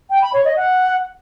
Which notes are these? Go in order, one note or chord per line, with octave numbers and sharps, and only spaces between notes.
G5
B5
C#5
D#5
F#5